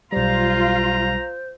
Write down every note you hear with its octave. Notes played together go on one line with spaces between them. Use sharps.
B1 G3 F4 C5 A#5